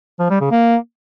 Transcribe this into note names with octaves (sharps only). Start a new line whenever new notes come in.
F3
G3
C#3
A#3